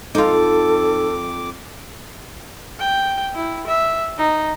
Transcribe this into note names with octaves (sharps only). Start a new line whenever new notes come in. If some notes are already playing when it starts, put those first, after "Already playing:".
F2 D#4 F4 A4 D6
G5
E4
E5
D#4